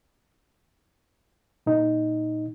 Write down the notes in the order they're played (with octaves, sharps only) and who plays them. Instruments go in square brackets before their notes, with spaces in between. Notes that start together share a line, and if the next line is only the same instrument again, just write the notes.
[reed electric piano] A#2 D#4